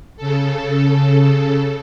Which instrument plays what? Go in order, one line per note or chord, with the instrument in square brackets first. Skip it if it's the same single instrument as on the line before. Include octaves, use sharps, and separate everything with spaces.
[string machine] C#3 A4